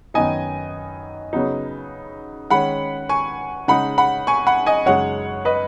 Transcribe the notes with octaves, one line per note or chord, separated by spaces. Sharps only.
F#2 D#3 B3 D#4 D#5 G#5
C#3 F#3 B3 D#4
D#3 G#3 C#4 F#5 B5
G#5 C#6
C#3 G#3 D#4 F#5 B5
F#5 B5
G#5 C#6
F#5 B5
D#5 G#5
F#2 C#3 G#3 D#4 C#5 F#5
B4 D#5